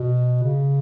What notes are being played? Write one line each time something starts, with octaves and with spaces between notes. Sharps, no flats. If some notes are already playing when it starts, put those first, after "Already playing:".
Already playing: B2
C#3